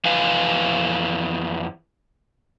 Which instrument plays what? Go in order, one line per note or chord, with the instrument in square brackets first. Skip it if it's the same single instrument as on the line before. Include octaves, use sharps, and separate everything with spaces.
[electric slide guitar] F2 E3 B4 F5 G#5